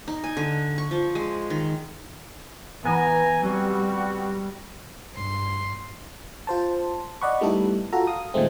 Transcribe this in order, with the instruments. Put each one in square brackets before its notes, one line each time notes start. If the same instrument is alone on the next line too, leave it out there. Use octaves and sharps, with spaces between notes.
[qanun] D#4
G#5
D3
C#6
F3
G#3
D#3
[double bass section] E3 [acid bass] B3 [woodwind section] G#5 A#5
[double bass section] G3 [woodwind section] C4 F#4
[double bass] G2 [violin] C6
[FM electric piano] F4 C5 A5
D5 D#5 F#5 B5 C#6
G3 A3 B3 D#4 E4 A4
F4 F#4 A4 A#5
F5 D#6
A#2 D#3 F3 G#3 A3 C4